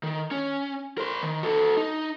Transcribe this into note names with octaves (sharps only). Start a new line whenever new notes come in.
D#3
C#4
A#4 C5
D#3
F#4 A4
D#4